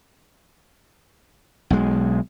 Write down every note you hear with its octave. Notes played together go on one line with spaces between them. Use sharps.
B1 G#3